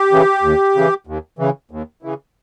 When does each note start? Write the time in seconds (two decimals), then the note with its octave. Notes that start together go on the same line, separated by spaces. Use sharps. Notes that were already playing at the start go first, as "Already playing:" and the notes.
Already playing: G4
0.11 C#3 E3
0.43 D#2
0.75 C#3 E3
1.07 D#2
1.39 C#3 E3
1.71 D#2
2.03 C#3 E3